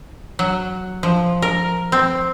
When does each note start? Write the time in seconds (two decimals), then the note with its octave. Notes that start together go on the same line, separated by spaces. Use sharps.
0.39 F#3
1.03 F3
1.42 A#4
1.92 C4